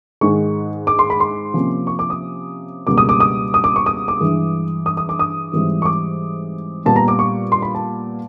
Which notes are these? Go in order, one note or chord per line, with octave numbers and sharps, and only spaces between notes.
G#2 D#3 G#3 C#6
D6
C6
B5
C6
C3 F3 A#3 C#4
C#6
D6
D#6
C#2 B2 G3 A#3 D6
D#6
D6
D#6
D#6
D6
C#6
D#6
D6
G2 E3 G#3
D#6
D#6
D6
D#6
G#2 E3 G3 C4
C#6
D6
A#2 G3 B3 A5
A#5
D6
C#6
C6
B5
A5